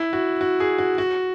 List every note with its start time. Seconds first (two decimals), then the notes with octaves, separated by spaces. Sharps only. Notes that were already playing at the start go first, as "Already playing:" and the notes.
Already playing: E4
0.13 F#4
0.41 F#4
0.60 G#4
0.78 F#4
0.98 F#4